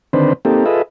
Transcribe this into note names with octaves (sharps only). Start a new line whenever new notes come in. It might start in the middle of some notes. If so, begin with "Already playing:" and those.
D3 D#3 C4 D4 B4 C5
A#3 C4 D#4 G4 A4
F4 G#4 A4 B4 D#5 E5